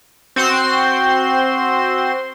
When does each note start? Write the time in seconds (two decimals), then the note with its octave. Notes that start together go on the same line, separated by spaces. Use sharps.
0.36 C4 F#4 C5 C6